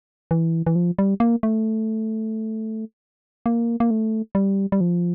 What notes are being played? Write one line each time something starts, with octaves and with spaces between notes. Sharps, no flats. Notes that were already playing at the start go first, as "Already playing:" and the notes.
E3
E3
F3
G3
A#3
A3
A#3
A#3
A3
G3
G3
F3